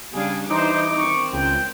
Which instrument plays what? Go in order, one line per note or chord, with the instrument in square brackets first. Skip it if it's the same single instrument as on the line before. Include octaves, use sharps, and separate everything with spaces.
[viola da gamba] C#3 G3 D4 [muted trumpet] G#4 [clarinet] F5
[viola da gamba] E3 [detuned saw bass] D#4 [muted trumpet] C5 [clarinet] D6
[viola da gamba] D#3 C4 [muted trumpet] C#6
[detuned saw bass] C#2 [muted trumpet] G5